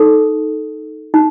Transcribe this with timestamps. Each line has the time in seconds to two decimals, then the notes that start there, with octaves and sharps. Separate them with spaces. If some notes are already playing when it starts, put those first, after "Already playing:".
Already playing: D#4 A4
1.14 D#4